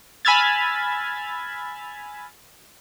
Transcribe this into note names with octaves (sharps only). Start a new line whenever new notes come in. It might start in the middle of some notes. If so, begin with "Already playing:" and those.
G#5 B5 E6 F6 G#6 A6